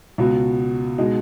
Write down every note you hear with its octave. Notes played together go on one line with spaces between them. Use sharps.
C#2 B2 B3 F#4
B2 G#3 D#4